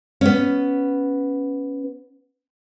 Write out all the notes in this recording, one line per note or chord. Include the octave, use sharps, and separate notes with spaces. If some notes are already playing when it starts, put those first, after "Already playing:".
B3 C#4